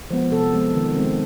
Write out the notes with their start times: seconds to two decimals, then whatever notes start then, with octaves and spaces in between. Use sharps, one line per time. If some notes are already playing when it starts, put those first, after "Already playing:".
0.11 F3 G#3 B3
0.32 C3 A4
0.53 F3 G#3 B3
0.74 D#3
0.96 G#3 C4